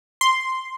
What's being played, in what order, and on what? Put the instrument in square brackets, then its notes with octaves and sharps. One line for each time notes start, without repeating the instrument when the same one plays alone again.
[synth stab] C6